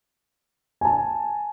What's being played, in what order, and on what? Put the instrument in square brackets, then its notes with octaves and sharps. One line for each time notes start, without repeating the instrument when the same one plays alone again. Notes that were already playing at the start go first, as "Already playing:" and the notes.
[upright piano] G#5 A5